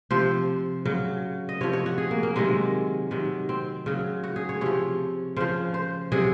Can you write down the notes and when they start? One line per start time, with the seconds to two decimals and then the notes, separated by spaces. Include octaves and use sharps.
0.11 C3 F3 C5
0.85 C#3 F#3
1.49 D#5
1.61 C3 F3 C#5
1.73 C#5
1.86 F#4
1.98 G#4
2.11 A#3
2.23 A#3
2.36 C3 D#3 F#3 G#3
3.11 C3 D#3 F#3
3.49 C4
3.86 C#3 F#3
4.24 F#4
4.36 G#4
4.49 C#5
4.61 C3 F3 C#5
5.36 C#3 F3 C5
5.74 C5
6.12 C3 F#3 G#4